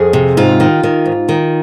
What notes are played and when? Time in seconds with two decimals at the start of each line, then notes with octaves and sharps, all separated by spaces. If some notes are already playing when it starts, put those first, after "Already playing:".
Already playing: F2 G#4
0.13 C3
0.37 G#2 F4
0.60 D#3
0.83 D#3
1.06 G#2
1.29 D#3